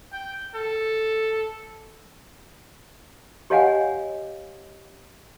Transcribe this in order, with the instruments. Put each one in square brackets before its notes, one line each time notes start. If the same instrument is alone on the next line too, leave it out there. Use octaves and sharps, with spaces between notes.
[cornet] G5
A4
[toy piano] G4 C#5 D#5 F5 F#5 G#5